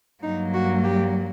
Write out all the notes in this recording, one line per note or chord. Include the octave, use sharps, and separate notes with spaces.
G2 F#3 A#3 D#4
F#4
G4